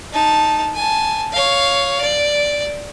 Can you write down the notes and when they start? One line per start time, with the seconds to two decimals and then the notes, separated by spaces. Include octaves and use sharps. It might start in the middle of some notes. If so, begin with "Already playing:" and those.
0.13 D#4 A5
0.75 G#5 A5
1.32 C#5 F5
2.01 D5